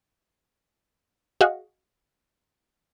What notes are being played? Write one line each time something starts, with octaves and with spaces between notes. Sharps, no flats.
F#4 G#4 D#5 F5 F#5